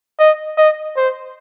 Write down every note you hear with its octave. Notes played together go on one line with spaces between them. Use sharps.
D#5
D#5
C5